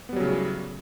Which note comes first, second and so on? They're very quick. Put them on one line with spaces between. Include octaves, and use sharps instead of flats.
B3 G3 F#3 C#3 A2